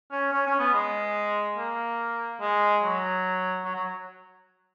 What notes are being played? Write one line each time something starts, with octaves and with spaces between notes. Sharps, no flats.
C#4
C#4
C#4
B3
G#3
A#3
G#3
F#3
F#3
F#3